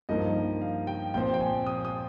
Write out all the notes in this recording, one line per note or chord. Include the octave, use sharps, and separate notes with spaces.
G2 F3 A#3 D#4 D#5
F5
G5
A#2 F3 C4 G5
G5
G#5
D#6
D#6